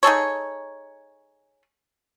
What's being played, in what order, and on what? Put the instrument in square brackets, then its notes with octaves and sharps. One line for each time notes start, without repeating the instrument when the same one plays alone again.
[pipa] D#4 G#4 A4 C#5